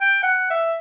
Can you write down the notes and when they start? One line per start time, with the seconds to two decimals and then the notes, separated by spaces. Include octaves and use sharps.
0.01 G5
0.23 F#5
0.50 E5